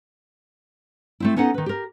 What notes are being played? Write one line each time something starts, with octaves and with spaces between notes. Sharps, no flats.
A3 C4 E4
B3 C#4 D#4 A4 F#5
D#3 B4
G4 A#4